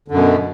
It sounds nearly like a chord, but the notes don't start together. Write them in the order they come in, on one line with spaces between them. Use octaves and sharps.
D3 F#2 B2